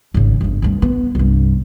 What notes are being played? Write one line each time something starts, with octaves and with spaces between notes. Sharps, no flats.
G#1 C#3
G1 F2
D2 G2
B3
C2 G2